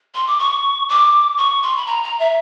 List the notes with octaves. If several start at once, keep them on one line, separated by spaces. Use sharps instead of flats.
C6
D6
C#6
D6
C#6
C6
B5
A#5
A#5
E5